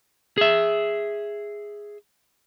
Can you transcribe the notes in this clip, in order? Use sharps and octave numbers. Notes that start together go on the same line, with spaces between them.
G#4 E5